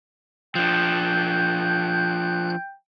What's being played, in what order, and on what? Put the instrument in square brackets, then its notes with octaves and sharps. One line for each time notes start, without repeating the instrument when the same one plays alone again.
[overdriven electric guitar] F3 D4 [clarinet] G5 [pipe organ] F#6 G6